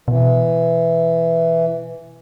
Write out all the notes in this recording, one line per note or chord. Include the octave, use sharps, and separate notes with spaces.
B2 E3